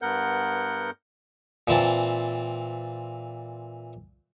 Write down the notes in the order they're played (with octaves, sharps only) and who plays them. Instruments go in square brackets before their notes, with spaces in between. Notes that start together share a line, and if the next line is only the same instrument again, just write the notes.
[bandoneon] G2 B3 A#4 F#5 G6
[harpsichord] A#2 E3 C4 A5